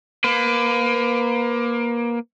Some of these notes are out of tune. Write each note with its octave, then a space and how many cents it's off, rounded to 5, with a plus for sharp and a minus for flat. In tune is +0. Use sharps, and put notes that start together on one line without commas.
A#3 +20 B4 +35